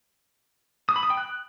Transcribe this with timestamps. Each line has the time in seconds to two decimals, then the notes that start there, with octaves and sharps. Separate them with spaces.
0.89 D#6
0.96 B5
1.03 D#6
1.10 G5
1.17 F#6